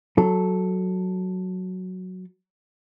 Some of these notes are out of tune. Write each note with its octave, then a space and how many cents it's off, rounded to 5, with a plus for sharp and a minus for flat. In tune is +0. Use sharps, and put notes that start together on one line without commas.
F#3 +0 A4 +0